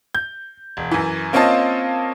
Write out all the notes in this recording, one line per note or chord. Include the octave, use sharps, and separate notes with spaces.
G6
E1
F#2 E3
A#3 C4 C#4 F4 D#5 A5